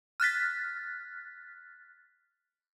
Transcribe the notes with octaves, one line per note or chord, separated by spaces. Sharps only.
F6 F#6 A6 B6